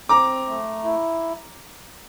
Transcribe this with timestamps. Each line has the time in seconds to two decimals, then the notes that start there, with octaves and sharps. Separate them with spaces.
0.09 C4 A#5 D6
0.47 A3
0.84 E4